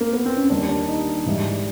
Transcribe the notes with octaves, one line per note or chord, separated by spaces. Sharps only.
A#3
B3
C4
C#4
D#2 D#3 G3 D4
D4
D#4
G#2 E3 G3